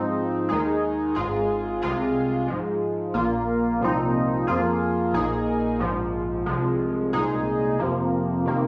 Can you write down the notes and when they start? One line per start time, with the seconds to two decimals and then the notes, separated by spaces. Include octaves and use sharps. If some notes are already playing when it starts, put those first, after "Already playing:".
Already playing: G#2 F3 C4 D#4
0.49 D#2 D#3 G#3 D#4 G#4
1.15 G#1 G#2 G#3 F4 G#4
1.82 C2 C3 G#3 F4 G#4
2.48 G#2 F3 G#3
3.14 A#1 A#2 A#3 F4
3.80 C2 A#2 F3 C4 D#4
4.47 F2 F3 A#3 F4 G#4
5.13 A#1 A#2 A#3 D#4 G#4
5.79 A#1 G#2 F3
6.46 C2 C3 F3 G#3
7.13 C2 A#2 G#3 D#4 G#4
7.79 F2 C3 F3 A#3
8.45 C3 D#3 A#3